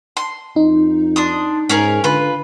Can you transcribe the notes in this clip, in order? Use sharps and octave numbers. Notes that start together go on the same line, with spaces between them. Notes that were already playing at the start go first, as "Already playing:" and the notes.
C6
F2 D#4
D4 C6 D#6
G#2 C#4 G#4 A#4
D3 F4 B4